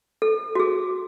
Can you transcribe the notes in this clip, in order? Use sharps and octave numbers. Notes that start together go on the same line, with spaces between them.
A4
F#4
G#4